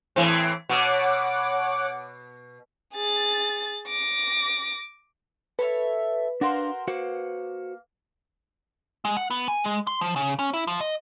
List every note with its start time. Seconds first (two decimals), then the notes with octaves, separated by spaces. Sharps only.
0.16 A2 E3 C4
0.69 B2 C#5 F#5 D6
2.94 G#4 A6
3.87 D6 A#6
5.59 A4 B4 C#5 E5
6.41 D4 F#4 A#4 C5 F5 C6
6.88 A#3 F#4 C5 F#5
9.05 G#3
9.17 F#5
9.30 B3
9.48 G#5
9.64 G#3
9.87 C6
10.01 F3
10.16 C#3
10.39 C#4
10.54 E4
10.67 F3
10.81 D#5